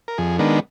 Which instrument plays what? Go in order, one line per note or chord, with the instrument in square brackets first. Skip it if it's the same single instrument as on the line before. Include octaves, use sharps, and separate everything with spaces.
[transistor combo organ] A#4
F2 G#4
D#3 G#3 B3 D4 A#4